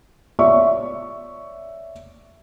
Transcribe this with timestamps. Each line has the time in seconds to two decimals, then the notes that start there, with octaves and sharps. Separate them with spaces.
0.39 C#5 D5 E5 C#6